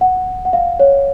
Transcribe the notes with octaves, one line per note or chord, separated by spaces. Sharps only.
F#5
F#5
F5
C#5